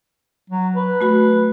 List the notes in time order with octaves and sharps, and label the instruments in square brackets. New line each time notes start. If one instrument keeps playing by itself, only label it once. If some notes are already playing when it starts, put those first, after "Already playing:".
[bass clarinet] F#3
B4
[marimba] A3 F#4 B5